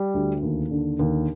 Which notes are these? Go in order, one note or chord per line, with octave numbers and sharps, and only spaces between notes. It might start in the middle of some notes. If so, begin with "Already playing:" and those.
Already playing: G3
D2
D#2
D3
D#2